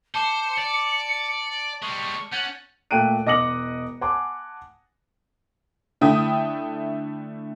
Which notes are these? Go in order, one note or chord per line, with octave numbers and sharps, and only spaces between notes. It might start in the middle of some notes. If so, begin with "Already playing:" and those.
C5 A5 D6 C#7 E7
D5
G3 G#3 C#6
C#4 F#5 G6 A6
A#2 A3 G5 F#6 D7 D#7
E1 D#5 D6 A#6 C#7 F#7
F#5 G#5 A5 C6 D6
D3 A3 E4 G5 D#6